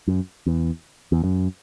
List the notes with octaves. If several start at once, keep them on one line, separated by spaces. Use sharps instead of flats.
F#2
E2
E2
F#2